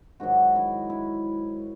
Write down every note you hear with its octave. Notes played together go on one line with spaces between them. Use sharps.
G#2 D#3 F#3 F#4
E4
E4